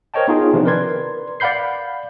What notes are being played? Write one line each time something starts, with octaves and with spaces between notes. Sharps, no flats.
A#4 C5 C#5 D#5 G5 A5
B3 D#4 F4 G#4
C3 D#3 F3 B3 C4 D4
A#4 B4 D5 C6 G#6
D5 F5 F#5 B5 G6 C7